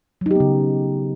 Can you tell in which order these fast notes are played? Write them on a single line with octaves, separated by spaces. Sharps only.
F#3 D#4 G4 B3 C#3